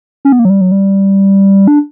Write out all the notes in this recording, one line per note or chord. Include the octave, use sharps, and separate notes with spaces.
C#4
B3
A#3
F#3
G3
F#3
G3
D4